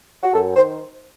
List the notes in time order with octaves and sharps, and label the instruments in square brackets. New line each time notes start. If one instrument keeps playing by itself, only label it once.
[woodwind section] F#4
F#2 A4
D#3 C5